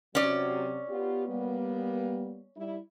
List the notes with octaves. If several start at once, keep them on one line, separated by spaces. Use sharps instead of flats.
C3 F#3 C#4 D5
B3 F4 G4
G3 A#3 B3
G3 E4